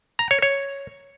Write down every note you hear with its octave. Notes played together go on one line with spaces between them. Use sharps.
A#5
C#5
C#5